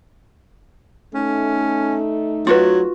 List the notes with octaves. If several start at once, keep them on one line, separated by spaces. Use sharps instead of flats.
A3 C#4 D#4
F#3 F4 F#4 B4